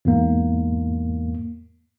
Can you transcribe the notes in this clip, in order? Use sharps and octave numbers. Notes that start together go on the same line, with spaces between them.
E2 G#2 A#3